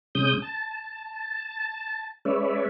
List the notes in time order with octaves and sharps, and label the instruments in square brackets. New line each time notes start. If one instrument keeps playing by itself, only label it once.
[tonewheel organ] C3 G#3 C#4 D#6 G6
A5
G#3 C#4 B4 C#5 D5 E5